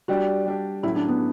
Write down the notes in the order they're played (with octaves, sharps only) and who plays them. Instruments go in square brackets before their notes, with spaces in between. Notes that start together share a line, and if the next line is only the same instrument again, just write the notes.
[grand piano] G3 D4 G4 [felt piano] F#4
[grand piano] G3 D4 G4
[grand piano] A2 F#3 C#4 [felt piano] E4
[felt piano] D4
B3